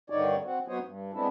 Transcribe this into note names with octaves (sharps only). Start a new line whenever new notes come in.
G2 D3 D#3 D#4 C#5 D5
C4 F#4
F#3 B3 F#4 C5 C#5 D#5
G2
G#3 B3 C4 D4 E4 A4